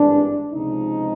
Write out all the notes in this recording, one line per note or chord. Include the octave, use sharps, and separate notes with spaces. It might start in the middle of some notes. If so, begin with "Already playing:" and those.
Already playing: G#1 G2 E3 D4
C#2 C3 F3 G#3 D#4